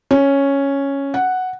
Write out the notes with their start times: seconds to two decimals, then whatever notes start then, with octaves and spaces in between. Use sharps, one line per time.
0.11 C#4
1.14 F#5